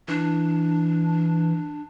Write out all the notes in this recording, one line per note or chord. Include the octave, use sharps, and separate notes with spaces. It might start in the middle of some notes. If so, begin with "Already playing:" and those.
E3 D4